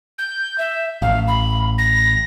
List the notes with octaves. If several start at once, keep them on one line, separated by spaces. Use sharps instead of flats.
G6
E5
A1 F5
B5
A#6